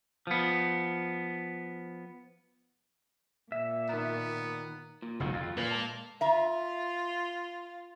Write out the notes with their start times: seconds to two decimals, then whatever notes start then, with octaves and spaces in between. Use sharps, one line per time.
0.27 F3 B3
3.52 A#2 E5
3.89 D#3 B3 A#4
5.02 A#2
5.20 F#1 C2 F2 G#2 D#3 F#4
5.33 F2 F4
5.57 A#2 A#3 B4 C5 F5
5.71 G#3 A#4 A5
6.21 F4 E5 A#5